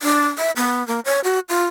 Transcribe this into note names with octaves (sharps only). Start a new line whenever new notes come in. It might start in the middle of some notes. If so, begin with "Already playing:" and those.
D4
E5
B3
A#3
C#5
F#4
F4